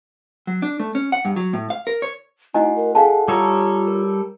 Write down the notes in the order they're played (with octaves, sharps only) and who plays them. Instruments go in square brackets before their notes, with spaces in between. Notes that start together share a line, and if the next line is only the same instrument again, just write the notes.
[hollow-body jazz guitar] F#3
D4
A3
C#4
F#5
G2
F#3
A2
F5
A#4
C#5
[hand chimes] A3 F#4 F#5 [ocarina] D#4 [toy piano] E4 D#5 G#5
[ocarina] A#4
[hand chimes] E4 A4 F#5 [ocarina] G#4 [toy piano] F5 G#5 A5
[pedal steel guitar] G3 A4 C#5 [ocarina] F4 [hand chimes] A#5 D#6
[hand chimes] A#4